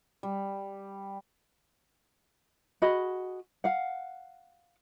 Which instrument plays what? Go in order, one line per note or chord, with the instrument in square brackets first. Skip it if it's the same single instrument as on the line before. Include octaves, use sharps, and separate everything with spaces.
[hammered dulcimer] G3
[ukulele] F#4 G#4 D#5 B5
F5 F#5